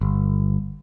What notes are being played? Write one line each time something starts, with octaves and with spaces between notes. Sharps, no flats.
G1